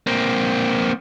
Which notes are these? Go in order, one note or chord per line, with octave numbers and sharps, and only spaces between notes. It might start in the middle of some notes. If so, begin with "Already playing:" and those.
A#3 C4